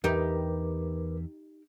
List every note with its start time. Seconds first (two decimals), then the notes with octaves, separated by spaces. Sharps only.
0.04 E2 D#4 G4 A#4 B4 D6